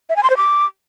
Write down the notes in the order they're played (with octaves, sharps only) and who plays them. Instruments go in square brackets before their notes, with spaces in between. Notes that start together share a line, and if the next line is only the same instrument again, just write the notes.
[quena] E5
G#5
C6
C5
D6